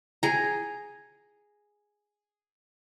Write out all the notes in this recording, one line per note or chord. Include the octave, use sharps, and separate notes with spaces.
G#4 A#5